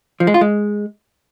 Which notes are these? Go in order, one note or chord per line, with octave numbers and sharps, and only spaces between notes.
F3
G#3
F4
G#3